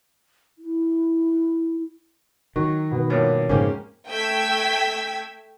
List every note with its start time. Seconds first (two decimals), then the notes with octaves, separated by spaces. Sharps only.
0.59 E4
2.56 D#3 F#3 C#6
2.91 B2 B3 B4
3.10 G2 A#2 F3 A#4 C#5
3.49 F2 G#2 C#3 A#3 C#4 G4 C5 G#5
4.08 A3 G5 E6 G#6 B6